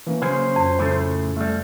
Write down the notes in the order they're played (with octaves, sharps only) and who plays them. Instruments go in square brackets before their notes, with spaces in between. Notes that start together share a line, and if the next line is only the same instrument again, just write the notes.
[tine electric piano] E3 A#3 C#4
[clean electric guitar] C#3 A#3 [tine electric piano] F#3 C#4 [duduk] C5
[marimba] F2
[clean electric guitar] A2 C#3 A3
[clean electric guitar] C2 G3 [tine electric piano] A3